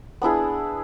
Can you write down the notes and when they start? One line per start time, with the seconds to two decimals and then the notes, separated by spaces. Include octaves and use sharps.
0.22 B3 D4 E4 G#4